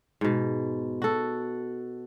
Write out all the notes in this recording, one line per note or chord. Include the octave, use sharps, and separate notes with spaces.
G#2 B2
F#4 A4